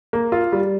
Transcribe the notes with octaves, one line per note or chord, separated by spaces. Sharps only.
A#3
F4
G3